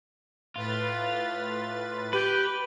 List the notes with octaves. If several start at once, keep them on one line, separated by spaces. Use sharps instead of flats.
A2 F4 B4 A6
G4 B4